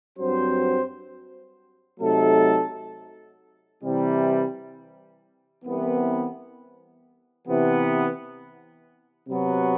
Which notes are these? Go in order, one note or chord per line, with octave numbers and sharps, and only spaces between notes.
G2 F#3 C4 F#4 C5
C3 F#3 A3 D#4 A4
C3 E3 G3
C2 C3 E3 B3
C3 E3 B3
C3 F#3 B3 F#4